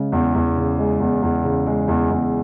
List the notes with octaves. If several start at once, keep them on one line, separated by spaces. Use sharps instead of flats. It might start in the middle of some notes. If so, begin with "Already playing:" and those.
Already playing: C#3 G#3
E2
E2
C#3
G#3
E2
E2
C#3
G#3
E2
E2